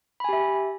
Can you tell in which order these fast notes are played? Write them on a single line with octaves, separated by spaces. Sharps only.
B5 G#5 G4 E5